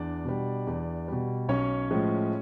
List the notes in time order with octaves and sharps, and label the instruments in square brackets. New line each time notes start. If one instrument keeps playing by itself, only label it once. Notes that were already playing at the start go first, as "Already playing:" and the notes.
Already playing: [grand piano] E2 D4 D5
B2 G3
E2
B2 G3
B1 C#4 C#5
A2 F3 G#3